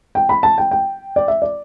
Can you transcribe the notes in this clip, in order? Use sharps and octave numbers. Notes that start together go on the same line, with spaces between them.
G5
B5
A5
G5
G5
D5
E5
D5